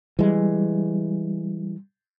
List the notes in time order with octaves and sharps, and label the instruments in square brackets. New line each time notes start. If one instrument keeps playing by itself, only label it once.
[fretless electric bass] E3 G#3 [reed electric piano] G3